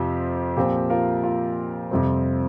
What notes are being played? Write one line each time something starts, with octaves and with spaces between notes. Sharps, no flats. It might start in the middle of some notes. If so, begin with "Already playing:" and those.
Already playing: F2 C3 F3 C4 G4
A#2 F3 C4 G4
F4 A#4
F4
F2 C3 G3 C4